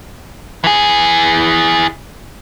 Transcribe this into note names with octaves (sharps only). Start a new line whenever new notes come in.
E3 G#4